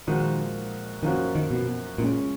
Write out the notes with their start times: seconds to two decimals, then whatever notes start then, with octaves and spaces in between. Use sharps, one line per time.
0.07 A#2 D#3 F3 G#3 D#4 F#4
1.03 F#2 D#3 F3 A#3 C#4 F#4
1.35 D#3
1.51 B2
1.98 A#2 C#3 G#3 C#4